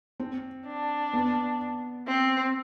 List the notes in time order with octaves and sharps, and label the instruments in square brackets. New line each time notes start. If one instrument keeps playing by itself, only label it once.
[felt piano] C4
[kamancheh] D4
[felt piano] B3
[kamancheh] C4